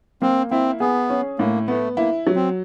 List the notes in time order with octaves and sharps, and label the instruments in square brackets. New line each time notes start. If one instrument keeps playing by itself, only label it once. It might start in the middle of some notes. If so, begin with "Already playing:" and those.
[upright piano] A#3 [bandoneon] C4
[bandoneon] C4 [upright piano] E4
[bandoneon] B3 [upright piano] G#4
[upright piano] C#4
[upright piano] A2 [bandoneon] A#3
[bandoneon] A3 [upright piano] B3
[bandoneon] A#3 [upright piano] E4
[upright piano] F#3
[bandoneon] C4